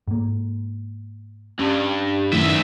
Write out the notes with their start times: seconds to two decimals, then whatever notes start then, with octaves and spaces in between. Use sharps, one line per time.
0.08 G#2 A#3
1.59 G2 C#4
2.33 B1 F#2 A2 D#3 E5